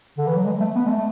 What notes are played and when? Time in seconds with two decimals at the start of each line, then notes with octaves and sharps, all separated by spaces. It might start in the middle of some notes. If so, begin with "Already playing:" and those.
0.18 D3
0.27 E3
0.36 F#3
0.45 G#3
0.60 A3
0.75 B3
0.86 G#3
0.90 A3